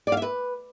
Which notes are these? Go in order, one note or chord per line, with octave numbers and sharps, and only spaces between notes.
D5
F5
E5
B4